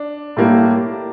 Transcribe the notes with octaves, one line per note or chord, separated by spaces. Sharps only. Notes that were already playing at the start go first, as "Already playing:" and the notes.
Already playing: D4
A2 G3 A#3